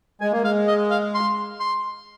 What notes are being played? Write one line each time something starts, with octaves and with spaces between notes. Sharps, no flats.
G#3 G#5
A#3
G#3 F5
D#5
F5
C6
C6